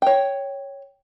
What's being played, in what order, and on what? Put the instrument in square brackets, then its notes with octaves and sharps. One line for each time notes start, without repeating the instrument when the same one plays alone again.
[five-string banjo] C#5 G5